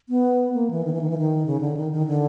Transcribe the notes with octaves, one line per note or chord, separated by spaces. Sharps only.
B3
A#3
E3
D#3
E3
D#3
E3
D#3
C#3
D3
D#3
D#3
D3